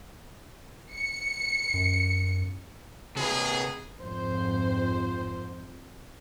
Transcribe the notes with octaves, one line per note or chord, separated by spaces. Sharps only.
C#7
F#2
C3 G#4 B4
F2 G#2 C5